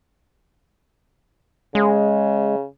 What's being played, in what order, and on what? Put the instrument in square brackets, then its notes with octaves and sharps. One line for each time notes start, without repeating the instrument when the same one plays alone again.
[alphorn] C#3 [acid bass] G#3